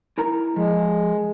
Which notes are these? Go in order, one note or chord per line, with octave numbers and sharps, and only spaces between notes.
E4 A#4 A#5
F3 G#3